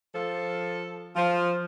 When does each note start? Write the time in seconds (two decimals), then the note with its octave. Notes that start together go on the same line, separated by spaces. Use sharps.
0.15 F3 A4
1.16 F3